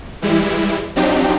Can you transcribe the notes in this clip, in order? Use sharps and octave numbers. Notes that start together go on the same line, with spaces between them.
E3 G3 G#3 E4
F3 F#3 C4 D4 D#4 G4